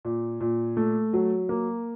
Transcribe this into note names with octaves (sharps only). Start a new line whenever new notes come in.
A#2
A#2
A3
F#3
A#3